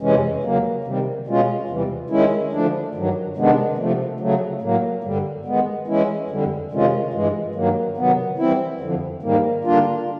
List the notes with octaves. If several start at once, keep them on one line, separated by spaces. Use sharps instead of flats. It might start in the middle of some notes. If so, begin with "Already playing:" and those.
F2 C3 E3 G#3 C#4
C#3 F#3 A#3
C3 D#3 G3
B2 G#3 C#4 F4
E2 C3 E3 G3
D#3 G#3 C#4 E4
D3 F3 A3 D4
G2 D#3 F#3
C3 D#3 G#3 B3 D4
C3 F3 A3
C#3 F#3 A3
A2 F#3 A#3
G2 D3 G3
D#3 G#3 B3
E3 G#3 C#4 E4
F2 D3 G3
C3 D#3 G#3 C#4 F4
G2 E3 G#3
G2 D#3 F#3 A#3
C3 D#3 F#3 B3
E3 G3 C4 E4
F2 D3 F3
G#2 D#3 G3 A#3
D3 G3 A#3 D4 F4